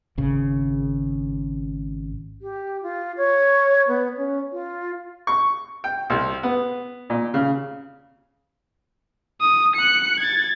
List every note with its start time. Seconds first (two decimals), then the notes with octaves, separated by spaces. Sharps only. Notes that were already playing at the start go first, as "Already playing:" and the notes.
0.18 G#1 C#3
2.42 G4
2.83 F4
3.17 C#5
3.88 B3
4.17 C#4
4.52 F4
5.27 C#6
5.84 G5
6.10 C2
6.43 B3
7.10 A#2
7.34 C#3
9.41 D#6
9.76 F#6 C#7
10.20 G#6 A6